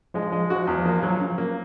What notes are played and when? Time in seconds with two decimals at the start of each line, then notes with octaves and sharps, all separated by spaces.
0.14 F3 G#3
0.32 G#3
0.50 F#4
0.67 E2
0.85 A#3
1.03 F#3
1.20 C#3
1.38 A#3